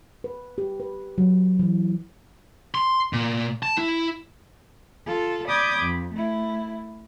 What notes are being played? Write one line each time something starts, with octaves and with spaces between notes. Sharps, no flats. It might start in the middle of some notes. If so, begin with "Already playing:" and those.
B4
G4
B4
F#3
E3
C6
A#2
A5
E4
F4 A4
D5 B5 D6 D#6 G6 G#6
F2
A3 E4